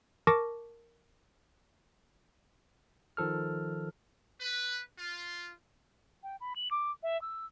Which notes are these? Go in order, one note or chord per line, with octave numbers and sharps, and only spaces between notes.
A#4 A5 C#6 D6 A#6
D#3 F3 A4 F6
B4
F4
G5
B5
F#7
D6
E5
E6